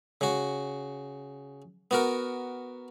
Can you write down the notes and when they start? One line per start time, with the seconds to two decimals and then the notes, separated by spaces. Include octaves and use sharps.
0.21 C#3 F#4
1.91 B3 F#4 A#4